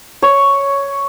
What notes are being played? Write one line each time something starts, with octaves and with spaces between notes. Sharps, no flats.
C#5